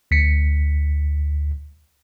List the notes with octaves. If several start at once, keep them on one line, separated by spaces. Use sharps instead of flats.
D2 B6 C#7